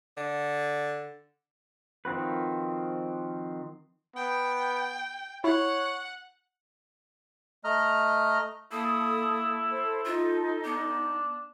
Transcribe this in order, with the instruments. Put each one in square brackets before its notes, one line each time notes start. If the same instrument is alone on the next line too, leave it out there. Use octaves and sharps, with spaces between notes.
[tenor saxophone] D3
[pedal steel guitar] D#3 F3 C4 F#4 B4
[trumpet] B3 [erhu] G5
[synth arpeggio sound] E4 [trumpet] C#5 [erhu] F#5
[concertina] A3 D#5 A#5 F6
[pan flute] A#3 [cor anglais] E4 [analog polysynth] A4 [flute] D#6
[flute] C5
[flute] D#4 [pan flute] F4
[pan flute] B3 [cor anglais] D4